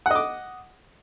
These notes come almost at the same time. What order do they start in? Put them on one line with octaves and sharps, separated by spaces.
F#5 D#5 D6